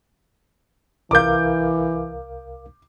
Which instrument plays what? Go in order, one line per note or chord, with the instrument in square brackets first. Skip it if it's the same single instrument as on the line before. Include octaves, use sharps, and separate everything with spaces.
[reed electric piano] C2 A#4 F5 [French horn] E3 [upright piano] D6 G6